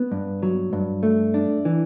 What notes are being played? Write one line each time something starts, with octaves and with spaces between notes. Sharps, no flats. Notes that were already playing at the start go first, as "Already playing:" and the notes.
Already playing: B3
G2
F#3
G2
A3
D4
E3